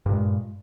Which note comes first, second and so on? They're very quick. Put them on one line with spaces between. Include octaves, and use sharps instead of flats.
G2 A#2 G#3